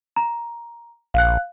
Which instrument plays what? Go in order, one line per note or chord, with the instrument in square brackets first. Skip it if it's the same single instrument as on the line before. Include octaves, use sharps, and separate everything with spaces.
[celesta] A#5
[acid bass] A#1 [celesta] F5 F#6